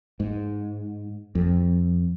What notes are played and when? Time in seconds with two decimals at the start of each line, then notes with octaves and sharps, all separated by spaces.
0.20 G#2
1.35 F2